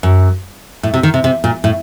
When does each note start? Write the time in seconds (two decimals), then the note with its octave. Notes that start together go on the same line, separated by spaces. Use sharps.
0.03 F#2
0.83 A2
0.94 C3
1.03 D#3
1.14 C3
1.24 C3
1.44 A#2
1.64 A2